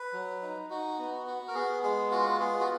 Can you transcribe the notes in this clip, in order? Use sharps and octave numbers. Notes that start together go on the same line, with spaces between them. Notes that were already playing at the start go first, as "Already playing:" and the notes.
Already playing: B4
F#3
D#4
D#4 F#4
B3
F#4
A#4
B3 G#4
G#3 G#4
F4 F#4
B3 G#4
F#4